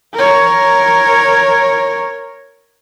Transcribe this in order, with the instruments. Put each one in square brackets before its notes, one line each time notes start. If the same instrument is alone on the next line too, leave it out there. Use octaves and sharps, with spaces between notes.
[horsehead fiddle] A#4 C#5